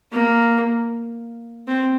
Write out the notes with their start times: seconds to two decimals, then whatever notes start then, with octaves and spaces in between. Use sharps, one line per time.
0.12 A#3
1.68 C4